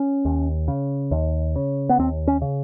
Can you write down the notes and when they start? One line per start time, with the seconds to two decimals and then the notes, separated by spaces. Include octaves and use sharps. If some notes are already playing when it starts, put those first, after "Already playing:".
Already playing: C#4
0.25 D#2
0.68 C#3
1.11 D#2
1.56 C#3
1.89 B3
1.99 D#2 C4
2.28 C#4
2.42 C#3